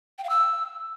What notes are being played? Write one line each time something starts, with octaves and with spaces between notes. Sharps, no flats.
G5
F5
E6